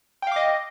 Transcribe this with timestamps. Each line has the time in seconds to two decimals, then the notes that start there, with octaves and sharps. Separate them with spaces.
0.22 G5
0.27 F5
0.32 D6
0.36 D#5